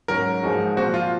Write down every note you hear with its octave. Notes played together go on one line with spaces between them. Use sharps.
G#2 F#3 C#4 A#4
G#2 F3 G#3 D#4 F#4
A#2 F3 C4 F#4
F4